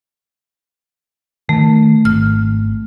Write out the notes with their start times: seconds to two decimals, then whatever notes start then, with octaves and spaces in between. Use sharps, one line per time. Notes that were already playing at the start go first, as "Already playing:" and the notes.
1.49 D#3 A3
2.05 G#1 F6